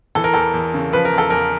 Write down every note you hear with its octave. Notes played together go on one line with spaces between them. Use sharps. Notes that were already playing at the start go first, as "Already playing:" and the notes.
E3 A4
A#4
E2 A4
E2
C#3
F3 B4
A#4
E2
A4
E2 A#4